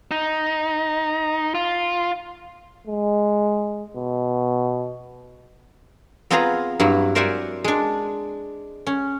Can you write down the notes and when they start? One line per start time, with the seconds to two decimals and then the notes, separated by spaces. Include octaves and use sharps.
0.11 D#4
1.55 F4
2.87 G#3
3.97 B2
6.30 B3 C4 F4 G#4 B4 A#5
6.80 G2 F#3 E4
7.15 A#4 C5 D5 E5 F#5 G#5
7.64 G#3 D4
8.87 C#4